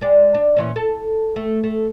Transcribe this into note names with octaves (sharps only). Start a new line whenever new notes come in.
G#3 D5
D4
A#2 E3 C#4
A4
A3
A3